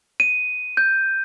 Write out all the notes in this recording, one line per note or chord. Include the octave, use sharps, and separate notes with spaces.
D#7
G6